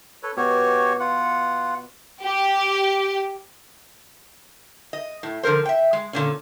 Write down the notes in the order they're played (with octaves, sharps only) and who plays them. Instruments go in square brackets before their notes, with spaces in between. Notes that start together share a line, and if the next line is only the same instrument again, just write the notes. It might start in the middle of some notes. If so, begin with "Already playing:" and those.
[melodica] A4 B4 C#5
[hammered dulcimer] B2 [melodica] F#4 G4 C#5
[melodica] F4 F#5
[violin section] G4
[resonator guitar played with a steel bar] D#5
A2
D3 F3 A#4 C5
E5 G5
G#3
A#2 D3 C#4